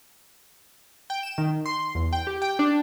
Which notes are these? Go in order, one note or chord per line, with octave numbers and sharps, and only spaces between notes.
G5
E7
D#3
C6
E2
G5
G4
G5
D4